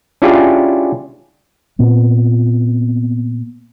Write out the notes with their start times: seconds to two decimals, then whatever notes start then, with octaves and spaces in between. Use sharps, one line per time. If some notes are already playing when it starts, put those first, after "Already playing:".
0.22 C#4 D4 E4 F4 G4 G#4
1.79 A#2 B3 C4